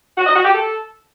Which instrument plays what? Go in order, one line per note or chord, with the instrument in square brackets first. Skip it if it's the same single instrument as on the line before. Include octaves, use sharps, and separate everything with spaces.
[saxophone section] F#4
D#5
F#4
G4
A4